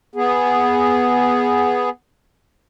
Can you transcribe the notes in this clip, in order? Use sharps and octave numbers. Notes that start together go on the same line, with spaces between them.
B3 G#4